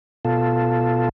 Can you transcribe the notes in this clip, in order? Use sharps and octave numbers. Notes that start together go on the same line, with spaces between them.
B2 F4 A4